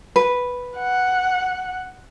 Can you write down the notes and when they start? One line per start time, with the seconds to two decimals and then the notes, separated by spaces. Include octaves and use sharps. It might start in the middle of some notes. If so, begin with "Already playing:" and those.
0.16 B4
0.77 F#5